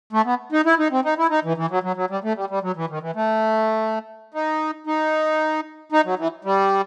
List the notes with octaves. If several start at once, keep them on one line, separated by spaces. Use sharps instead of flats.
A3
B3
D#4
E4
D#4
C4
D#4
E4
D#4
E3
E3
F#3
F#3
F#3
G3
A3
G3
G3
F#3
E3
D#3
E3
A3
D#4
D#4
D#4
F#3
E3
G3